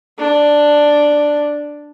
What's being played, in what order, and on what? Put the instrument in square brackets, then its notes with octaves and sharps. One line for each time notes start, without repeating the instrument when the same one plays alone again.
[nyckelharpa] D4